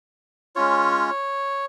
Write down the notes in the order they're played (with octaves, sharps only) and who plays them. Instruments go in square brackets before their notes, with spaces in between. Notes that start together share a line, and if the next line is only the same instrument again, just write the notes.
[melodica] G#3 C#4 F4 C#5